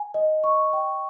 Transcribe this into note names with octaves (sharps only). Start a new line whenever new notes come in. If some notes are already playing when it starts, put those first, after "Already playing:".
Already playing: G#5
D#5
C#6
G5